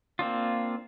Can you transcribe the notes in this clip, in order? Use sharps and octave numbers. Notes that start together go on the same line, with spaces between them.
A#3 C4 D4 F4